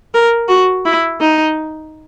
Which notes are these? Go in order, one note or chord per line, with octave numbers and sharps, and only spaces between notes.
A#4
F#4
E4
D#4